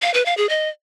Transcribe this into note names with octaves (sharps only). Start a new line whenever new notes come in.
F5
B4
F5
G#4
D#5